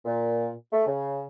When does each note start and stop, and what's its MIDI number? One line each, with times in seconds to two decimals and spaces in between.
0.05 0.50 46
0.72 0.82 57
0.86 1.24 49